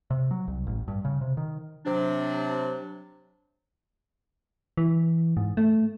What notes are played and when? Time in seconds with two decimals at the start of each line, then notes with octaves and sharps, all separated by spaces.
0.11 C3
0.31 F#3
0.47 C2
0.67 A1
0.88 G2
1.05 C#3
1.21 C3
1.37 D#3
1.86 C3 F#3 D4
4.77 E3
5.37 G#2
5.57 A3